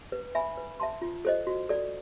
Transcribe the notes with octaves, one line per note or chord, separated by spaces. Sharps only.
B4
E5 G#5 B5
B4
E5 A5 C6
F4
A4 C5 D#5
F#4
A4 D5